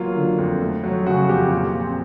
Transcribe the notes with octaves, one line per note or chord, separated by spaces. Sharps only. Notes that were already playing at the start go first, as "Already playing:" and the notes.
Already playing: F#3 A#3 F4
D3
F2
A3
F#3
C#3 F#4
F2 G4
A#2
C4